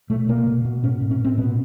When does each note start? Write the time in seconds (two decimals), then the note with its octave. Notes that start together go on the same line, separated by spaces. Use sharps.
0.10 B2 A3
0.29 B2 A#3
0.47 B2
0.65 B2
0.83 A2 C#4
1.01 A2
1.11 C#4
1.19 A2
1.25 C4
1.38 B2 B3